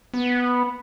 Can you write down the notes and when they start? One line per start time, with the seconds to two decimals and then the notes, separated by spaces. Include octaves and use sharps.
0.14 B3